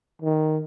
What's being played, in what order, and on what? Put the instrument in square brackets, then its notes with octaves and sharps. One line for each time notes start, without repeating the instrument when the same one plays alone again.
[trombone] D#3